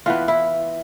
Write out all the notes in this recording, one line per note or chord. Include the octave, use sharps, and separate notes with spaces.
E3 B3 F4
E4